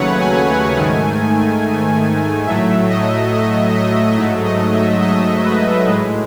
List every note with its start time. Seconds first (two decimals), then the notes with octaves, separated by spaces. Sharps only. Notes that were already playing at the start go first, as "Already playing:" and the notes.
Already playing: D#2 C#3 F#3 A3 B4 C#5 F#5
0.20 G#5
0.48 G#5
0.76 G#2 D#3 A3
2.47 A2 F#3 A3 E5
2.90 D#5
3.33 D#5
3.75 D#5
4.17 G#2 F#3 A3 E5
4.45 D#5
4.74 E5
5.02 D#5
5.45 B4
5.87 A2 G#3 B4